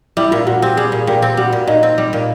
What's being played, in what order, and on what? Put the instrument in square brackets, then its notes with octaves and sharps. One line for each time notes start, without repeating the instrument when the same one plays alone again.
[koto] G3 [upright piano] E4
[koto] A#2 [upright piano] F4
[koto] A#2 [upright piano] F#4
[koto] C4 [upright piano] G4
[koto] G3 [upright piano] G#4
[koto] A#2
[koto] A#2 [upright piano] G4
[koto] C4
[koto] G3 [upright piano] F#4
[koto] A#2
[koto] A#2 [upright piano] D#4
[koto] C4
G3
A#2